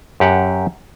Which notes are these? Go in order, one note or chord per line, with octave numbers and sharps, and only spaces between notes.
F#2 G4 F#5